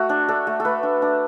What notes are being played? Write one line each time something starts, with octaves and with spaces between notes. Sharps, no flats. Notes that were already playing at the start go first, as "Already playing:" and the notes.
Already playing: A3 F#4
D4
D4 A4
A3
A4
A3 B4
D4
D4